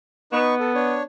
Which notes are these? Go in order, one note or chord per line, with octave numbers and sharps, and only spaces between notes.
B3 D#4 B4 C#6
A4
D4 C#5